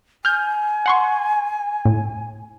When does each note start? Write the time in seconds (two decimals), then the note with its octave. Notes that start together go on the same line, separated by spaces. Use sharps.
0.25 G#5 F6 G6
0.86 F#5 C6 C#6
1.85 A2